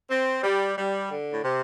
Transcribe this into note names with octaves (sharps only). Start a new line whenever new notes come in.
C4
G3
G3
D3
A2
C3